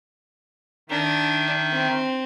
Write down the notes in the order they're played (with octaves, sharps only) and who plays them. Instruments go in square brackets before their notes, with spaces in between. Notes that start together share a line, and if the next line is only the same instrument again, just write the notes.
[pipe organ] D#3 D#4 E5 [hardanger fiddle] D4
[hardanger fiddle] C4